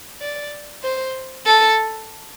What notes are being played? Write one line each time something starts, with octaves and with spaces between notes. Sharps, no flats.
D5
C5
A4